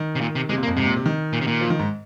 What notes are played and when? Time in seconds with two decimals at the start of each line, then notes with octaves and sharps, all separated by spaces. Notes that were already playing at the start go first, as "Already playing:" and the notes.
Already playing: D#3
0.15 C3
0.21 A#2
0.35 C3
0.49 C3 G#3
0.58 A#2
0.63 A#3
0.67 F2
0.76 G#2 C3
0.86 A#2
0.96 C3
1.06 D#3
1.33 A#2
1.41 C3
1.47 A#2
1.61 F3
1.70 D#3
1.79 G#2